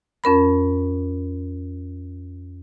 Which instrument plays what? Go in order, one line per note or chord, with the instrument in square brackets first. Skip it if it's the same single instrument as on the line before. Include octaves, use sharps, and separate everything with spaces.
[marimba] F2 C#4 A#4 B5